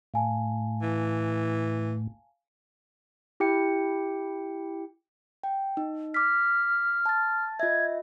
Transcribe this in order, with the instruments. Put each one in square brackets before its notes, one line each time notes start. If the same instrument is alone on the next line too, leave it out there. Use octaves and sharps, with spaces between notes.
[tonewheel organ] A2 [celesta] F5 G#5 A5
[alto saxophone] E3
[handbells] E4 G4 G5 C#7
[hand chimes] G5
D#4
[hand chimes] D6 B6 [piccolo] F6
[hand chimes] A5 A6
[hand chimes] F4 D#5 E5 [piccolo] G#6